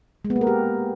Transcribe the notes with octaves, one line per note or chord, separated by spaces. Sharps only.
G#3
B3
A#3
A#4
G4